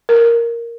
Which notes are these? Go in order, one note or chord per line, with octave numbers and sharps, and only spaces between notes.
A#4